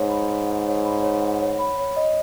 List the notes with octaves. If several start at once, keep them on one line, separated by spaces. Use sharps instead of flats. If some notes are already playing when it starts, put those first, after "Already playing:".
Already playing: G#2 C#5 F#5
B5
C#5
F#5
C#5
B5
C#5
F#5
C#5
B5
C#5
D#5